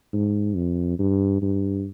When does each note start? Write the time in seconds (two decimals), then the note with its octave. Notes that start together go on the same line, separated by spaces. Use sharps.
0.13 G#2
0.56 F2
0.99 G2
1.42 G2